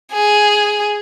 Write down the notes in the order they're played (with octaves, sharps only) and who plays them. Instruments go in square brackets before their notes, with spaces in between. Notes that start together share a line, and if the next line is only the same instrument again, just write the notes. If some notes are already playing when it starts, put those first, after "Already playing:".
[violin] G#4